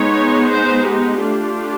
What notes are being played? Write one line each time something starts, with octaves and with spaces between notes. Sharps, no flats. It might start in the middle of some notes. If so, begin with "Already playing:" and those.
Already playing: G#3 B3 D#4 C#5
C5
G4
A3 D4 F4